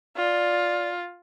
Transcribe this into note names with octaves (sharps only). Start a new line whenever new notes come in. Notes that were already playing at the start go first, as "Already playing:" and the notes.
F4 D5